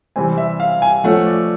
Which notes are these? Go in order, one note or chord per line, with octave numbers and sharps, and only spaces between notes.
C3 E3 G3 C4 G#5
E5
F5
G#5
F3 A3 C#4 F#5
D5